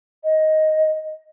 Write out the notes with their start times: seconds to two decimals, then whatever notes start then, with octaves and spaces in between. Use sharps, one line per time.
0.24 D#5